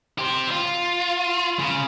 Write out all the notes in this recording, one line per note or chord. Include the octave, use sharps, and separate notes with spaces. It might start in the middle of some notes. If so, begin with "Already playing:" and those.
G4 C5
F4
C#3